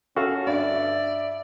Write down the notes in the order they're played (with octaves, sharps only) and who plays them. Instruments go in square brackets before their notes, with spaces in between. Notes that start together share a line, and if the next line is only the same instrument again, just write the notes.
[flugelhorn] C#4 [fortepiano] F#4 A4 F5
[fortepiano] G2 [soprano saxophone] D5 [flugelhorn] E5